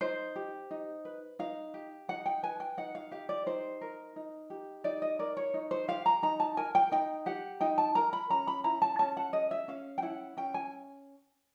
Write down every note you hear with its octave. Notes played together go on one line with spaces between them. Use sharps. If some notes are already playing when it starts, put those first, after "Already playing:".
D#4 C5
G4
D#4
B4
D#4 F5
G4
D#4 F#5
G5
B4 G#5
G5
D#4 F#5
F5
G4 F5
D5
D#4 C5
A#4
D#4
G4
D#4 D5
D#5
A#4 D5
C#5
D#4
C5
G4 F5
A#5
D#4 A#5
A5
A#4 G#5
G5
D#4 G5
G4 F#5
D#4 G5
A5
A#4 A#5
B5
C#4 A#5
B5
E4 A#5
A5
C#4 A5
F#5
G#4 D#5
E5
C#4 F5
G5
E4 F#5
C#4 G5
G#5